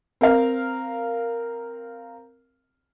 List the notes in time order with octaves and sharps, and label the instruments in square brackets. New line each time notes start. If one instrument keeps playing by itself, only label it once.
[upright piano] C4 A#4 F5